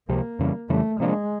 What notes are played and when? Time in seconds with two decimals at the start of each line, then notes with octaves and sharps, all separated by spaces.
0.09 C#2 C3 F3 A#3
0.39 F2 C#3 E3 G3
0.70 F2 C#3 E3 G3 A3
1.00 C3 F3 G#3 A#3 D4